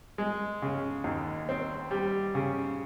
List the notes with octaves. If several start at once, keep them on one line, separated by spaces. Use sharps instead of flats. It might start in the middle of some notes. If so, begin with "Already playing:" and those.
G#3
C#3
D#2
C4
G3
C#3